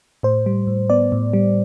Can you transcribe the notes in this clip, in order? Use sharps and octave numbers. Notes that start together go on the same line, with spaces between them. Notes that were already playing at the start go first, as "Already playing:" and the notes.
A2 C5
G3
A2
B3 D5
A2
G3